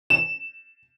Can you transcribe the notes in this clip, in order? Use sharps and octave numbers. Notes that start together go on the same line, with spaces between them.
E7